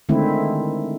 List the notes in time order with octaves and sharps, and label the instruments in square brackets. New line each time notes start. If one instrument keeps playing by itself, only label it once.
[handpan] D3 D#3 G#3 A3 C4 E4